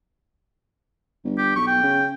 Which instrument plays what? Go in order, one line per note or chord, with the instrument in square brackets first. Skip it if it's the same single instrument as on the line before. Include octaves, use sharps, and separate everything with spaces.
[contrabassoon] G1
[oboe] G4
[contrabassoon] B1 [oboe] C#6
[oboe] G5
[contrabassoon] C#3